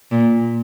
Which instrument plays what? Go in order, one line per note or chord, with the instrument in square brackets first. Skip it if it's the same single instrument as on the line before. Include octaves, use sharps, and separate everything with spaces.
[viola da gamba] A#2